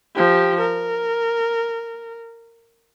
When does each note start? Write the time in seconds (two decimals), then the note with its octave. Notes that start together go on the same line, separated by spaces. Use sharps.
0.15 F3 G4
0.60 A#4